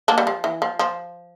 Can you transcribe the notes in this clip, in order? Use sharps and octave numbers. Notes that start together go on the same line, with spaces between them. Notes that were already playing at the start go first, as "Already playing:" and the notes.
A#3 D4
G3
F3
E3
F3
F3